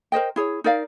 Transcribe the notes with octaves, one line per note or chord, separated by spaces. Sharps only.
A#4 C5 D#5 G5
E4 G#4 C#5
D#4 A#4 D5 F5